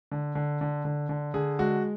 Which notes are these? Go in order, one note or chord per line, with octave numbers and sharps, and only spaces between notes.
D3
D3
D3
D3
D3
D3 G#4
G#3 F#4